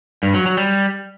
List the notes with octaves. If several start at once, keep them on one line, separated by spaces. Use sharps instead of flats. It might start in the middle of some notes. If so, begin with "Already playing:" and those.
G2
F#3
F#3
G3